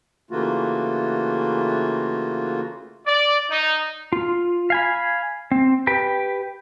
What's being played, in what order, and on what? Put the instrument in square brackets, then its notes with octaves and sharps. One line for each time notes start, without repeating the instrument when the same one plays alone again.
[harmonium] C#3 E3 A3 A#3 F4 F#4
[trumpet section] D5
D#4
[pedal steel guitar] F4
F5 G#5 B5
C4
G4 B4 G5